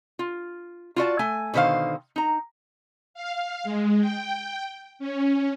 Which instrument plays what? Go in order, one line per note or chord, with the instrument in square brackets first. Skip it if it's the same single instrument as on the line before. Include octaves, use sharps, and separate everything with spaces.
[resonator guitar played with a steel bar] F4
F4 F#4 D5 A5
A3 G#5
B2 D3 D#3 C5 F5
D#4 A#5
[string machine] F5
G#3
G5
C#4